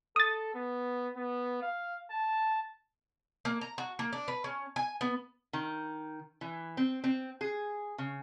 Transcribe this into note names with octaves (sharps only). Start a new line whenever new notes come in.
A4 D#6 A6
B3
B3
F5
A5
A#3
A#5
F#4
A#3
D4
B4
C#4
G#5
B3
D#3
E3
C4
C4
G#4
C#3